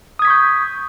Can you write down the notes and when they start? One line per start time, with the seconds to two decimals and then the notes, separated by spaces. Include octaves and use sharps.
0.19 D#6
0.22 G#6
0.25 B6
0.27 C#6
0.30 G6